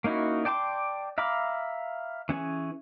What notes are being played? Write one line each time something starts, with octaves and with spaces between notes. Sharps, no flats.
A#3 C#4 D#4 E4 F#4
D5 G5 A5 C6 D6
E5 F5 A#5 B5 D6
E3 C#4 G#4